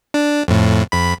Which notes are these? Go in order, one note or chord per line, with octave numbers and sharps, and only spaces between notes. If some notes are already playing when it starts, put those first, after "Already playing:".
D4
F2 A2
F2 B5